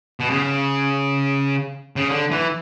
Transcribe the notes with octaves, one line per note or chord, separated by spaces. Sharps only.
B2
C#3
C#3
D3
E3